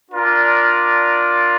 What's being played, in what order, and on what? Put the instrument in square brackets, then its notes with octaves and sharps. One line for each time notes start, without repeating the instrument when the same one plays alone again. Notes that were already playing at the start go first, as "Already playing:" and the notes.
[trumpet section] D4 F4 A#4 D5